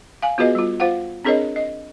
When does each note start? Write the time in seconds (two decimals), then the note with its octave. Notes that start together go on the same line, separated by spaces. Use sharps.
0.22 F5 G#5
0.38 B3 F4 F#4 G#4 B4 D#5
0.55 G3 F4
0.80 F4 C5 F5 F#5
1.24 C4 D4 G#4 A#4 C#5 D#5
1.56 D#5